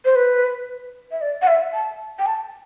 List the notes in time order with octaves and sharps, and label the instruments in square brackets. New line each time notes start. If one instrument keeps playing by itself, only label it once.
[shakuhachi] C5
B4
E5
D5
F#5
E5
A5
G5
A5